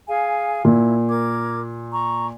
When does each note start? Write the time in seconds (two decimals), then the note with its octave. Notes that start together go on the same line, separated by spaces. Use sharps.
0.07 G#4 F5 G#5
0.65 A#2 E4
1.09 A#4 D6 G#6
1.92 A#5 C#6